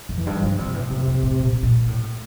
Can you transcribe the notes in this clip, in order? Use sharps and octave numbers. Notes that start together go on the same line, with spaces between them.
F2
E3
G2
D3 F3
C3 G3
A2 E3
F2 C3
F2
A2
A#2
A#2
A2